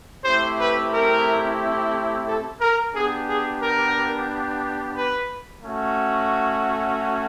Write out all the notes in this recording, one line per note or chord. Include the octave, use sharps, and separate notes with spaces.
A3 C4 E4 G4 C5
B4
A#4
A4
A#4
B3 D4 G4 G#4
G#4
A#4
B4
A3 C#4 F#4